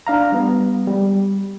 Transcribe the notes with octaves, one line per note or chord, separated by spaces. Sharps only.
D4 F5 A#5
G3 B3
G3